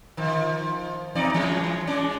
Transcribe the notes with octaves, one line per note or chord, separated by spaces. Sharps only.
D#3 F3
E2 D#4 D5
E3 G#3 C#4
G#3 C#4 D5